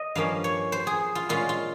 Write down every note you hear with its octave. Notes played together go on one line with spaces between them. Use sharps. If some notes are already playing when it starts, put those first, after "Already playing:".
Already playing: D#5
G2 F3 A#3 C#4 F5
C#5
C5
G#4
F4
A#2 G#3 C#4 F4
F4